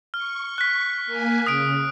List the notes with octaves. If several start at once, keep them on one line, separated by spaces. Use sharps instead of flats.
C#6 F6
F#6 B6
A#3 G#5
C#3 D#6 B6 D7